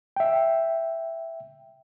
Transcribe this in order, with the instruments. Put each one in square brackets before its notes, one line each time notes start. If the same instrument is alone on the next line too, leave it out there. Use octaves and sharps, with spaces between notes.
[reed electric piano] E5 G5